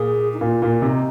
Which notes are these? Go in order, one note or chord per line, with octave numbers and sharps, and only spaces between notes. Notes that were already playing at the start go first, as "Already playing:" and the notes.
Already playing: A#2 G#4
D#4
A#2 F4
A#2
C3 D#4